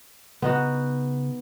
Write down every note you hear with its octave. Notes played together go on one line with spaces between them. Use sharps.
C#3 B3 D#4 F#4